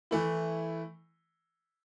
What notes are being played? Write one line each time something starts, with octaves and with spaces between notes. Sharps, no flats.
E3 A3 E4